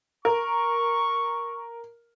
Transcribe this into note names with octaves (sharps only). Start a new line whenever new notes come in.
A#4 C#6